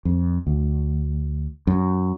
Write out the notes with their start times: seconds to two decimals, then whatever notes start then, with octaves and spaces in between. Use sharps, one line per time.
0.05 F2
0.47 D2
1.67 F#2